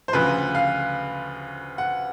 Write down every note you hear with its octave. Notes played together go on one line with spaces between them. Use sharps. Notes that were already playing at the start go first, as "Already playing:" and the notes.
C5
D2 C#3 F3 B4
F5
F#5